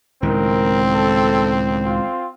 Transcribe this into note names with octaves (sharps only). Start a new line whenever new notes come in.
C#2 A2 D#3 C4 A#4
A4
F4